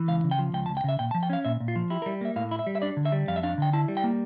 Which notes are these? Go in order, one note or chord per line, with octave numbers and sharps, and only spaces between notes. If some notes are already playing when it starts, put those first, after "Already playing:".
Already playing: E3
C#2 F5
C#3
G5
F3
C#2 G5
A5
C#2
G5
C#3 E5
A#2 G5
A5
F3
G5
C#4 F5
A#2 E5
A#2
F4
F3
E4 G4
A#4
G3
A#3 E5
A2 F5
E4
E5
G3
E5
D4 D5
D3
E5
G3
F2 F5
E5
D4 F5
D3 G5
E4 A5
G3
G5
A#3